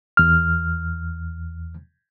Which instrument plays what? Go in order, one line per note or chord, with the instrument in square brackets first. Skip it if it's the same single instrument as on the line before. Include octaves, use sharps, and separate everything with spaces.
[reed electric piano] E2 F6